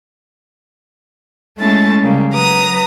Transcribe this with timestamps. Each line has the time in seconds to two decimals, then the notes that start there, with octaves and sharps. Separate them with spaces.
1.57 G#3 A3 C#4 E4 A5 A6
2.03 C#3 G3 A#3
2.32 F#3 B4 A#5 D#6 A#6